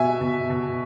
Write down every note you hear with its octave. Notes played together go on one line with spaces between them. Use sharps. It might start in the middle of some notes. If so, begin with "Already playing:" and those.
Already playing: B2 E5 G#5
B2
B2